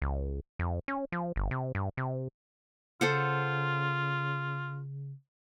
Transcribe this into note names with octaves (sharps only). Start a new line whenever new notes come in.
C#2
F2
C#4
F3
G1
C3
G2
C3
C#3 F4 A4 C5 F#5